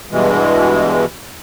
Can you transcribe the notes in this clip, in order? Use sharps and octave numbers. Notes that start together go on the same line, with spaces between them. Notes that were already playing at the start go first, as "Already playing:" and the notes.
G2 B2 E3 G#3